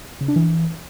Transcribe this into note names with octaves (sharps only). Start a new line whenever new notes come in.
C#3
D4
E3